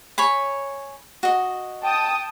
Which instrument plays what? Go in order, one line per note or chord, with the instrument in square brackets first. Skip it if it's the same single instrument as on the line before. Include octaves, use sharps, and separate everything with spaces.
[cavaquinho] C#5 G#5 B5
F#4 D#5
[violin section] G5 A5 D#6